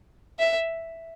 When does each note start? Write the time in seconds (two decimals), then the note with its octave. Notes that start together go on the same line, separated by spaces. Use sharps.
0.39 E5